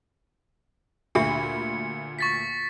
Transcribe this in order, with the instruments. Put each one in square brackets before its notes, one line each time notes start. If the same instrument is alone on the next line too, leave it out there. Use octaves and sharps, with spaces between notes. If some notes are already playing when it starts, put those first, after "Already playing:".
[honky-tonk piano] D2 A#2 B5 [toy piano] D4 G4 E5 [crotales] C#7
[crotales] C#6 A6 B6